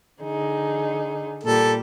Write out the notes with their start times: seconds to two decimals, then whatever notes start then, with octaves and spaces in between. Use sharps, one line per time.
0.22 D3 D#4 G#4
1.44 A#2 G3 A4